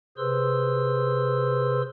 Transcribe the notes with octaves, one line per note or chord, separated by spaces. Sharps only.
C3 G#4 B4 C5 C6 E6